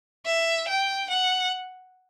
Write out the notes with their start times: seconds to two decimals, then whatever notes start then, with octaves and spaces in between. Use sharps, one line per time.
0.26 E5
0.68 G5
1.10 F#5